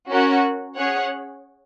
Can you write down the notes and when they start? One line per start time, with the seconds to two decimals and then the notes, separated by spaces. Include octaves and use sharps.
0.10 C#4 F#4 A#4 F#5
0.76 C#4 G#4 C#5 F#5